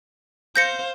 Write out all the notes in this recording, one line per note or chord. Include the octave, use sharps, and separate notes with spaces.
C5 F5 G6 A#6 C#7